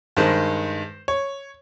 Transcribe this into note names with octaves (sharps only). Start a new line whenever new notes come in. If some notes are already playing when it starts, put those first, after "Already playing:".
G2 D#3 G#3 C5
C#5